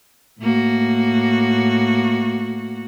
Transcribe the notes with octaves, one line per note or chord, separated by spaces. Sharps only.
A2 A#3 F#4